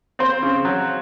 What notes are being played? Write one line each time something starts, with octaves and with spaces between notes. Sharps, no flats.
C4 C5
C#3
F#3